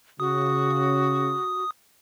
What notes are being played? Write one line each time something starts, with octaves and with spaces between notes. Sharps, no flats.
C#3 F#4 D#6